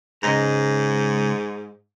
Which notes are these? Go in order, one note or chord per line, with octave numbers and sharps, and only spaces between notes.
C#2 G#2 D#5 A#5